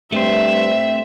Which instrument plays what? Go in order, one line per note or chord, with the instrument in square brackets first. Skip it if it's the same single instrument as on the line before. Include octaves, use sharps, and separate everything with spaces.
[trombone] G2 [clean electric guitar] A3 C4 C5 [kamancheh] E5